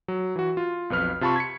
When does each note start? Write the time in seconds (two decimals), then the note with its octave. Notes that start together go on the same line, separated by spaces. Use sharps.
0.08 F#3
0.36 E3 F#4
0.57 F4
0.90 B1 F2 B4 F6
1.21 C3 F4 A5 B5 C#6
1.36 G#6 B6 C#7